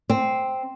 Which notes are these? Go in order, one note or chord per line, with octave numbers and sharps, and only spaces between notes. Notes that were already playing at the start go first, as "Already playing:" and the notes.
C4